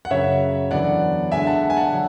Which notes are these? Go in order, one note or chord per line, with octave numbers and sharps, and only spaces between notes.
F#5
F#2 C#3 F#3 C#4 C#5 E5
E2 D3 F#3 B3 D5 F#5
D3 G#3 D4 E5 G#5
F#5 A5
G#5
F#5 A5
D3 F#3